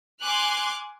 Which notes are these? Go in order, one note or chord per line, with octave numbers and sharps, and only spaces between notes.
G#5 C6 D6 F6 F#6